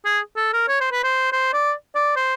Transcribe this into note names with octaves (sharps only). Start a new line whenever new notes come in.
G#4
A4
A#4
C#5
C5
B4
C5
C5
D5
D5
C5